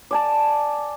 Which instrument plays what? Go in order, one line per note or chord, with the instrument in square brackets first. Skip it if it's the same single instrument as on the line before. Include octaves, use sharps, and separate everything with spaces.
[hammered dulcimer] D5 G#5 A5